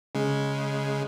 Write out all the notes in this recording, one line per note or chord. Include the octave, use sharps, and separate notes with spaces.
C#3 G#3